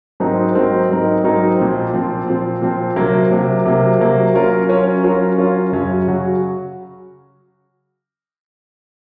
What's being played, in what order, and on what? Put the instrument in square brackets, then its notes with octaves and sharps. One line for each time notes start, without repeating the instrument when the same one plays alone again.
[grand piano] G#2 F#3 C4 D#4 A#4
G#2 F#3 C4 D#4 A#4
G#2 F#3 C4 D#4 A#4
G#2 F#3 C4 D#4 A#4
A#2 F3 C4
A#2 F3 C4
A#2 F3 C4
A#2 F3 C4
C3 F#3 A#3
C3 F#3 A#3
C3 F#3 A#3
C3 F#3 A#3
F#3 C#4 F4 A#4 C#5
F#3 C#4 F4 A#4 C#5
F#3 C#4 F4 A#4 C#5
F#3 C#4 F4 A#4 C#5
F#2 C#3 F#3 C#4 F#4
C#3 F#3 C#4 F#4